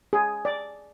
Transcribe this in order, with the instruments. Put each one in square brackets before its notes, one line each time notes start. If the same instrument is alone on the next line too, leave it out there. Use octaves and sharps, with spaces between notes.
[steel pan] G#4
D5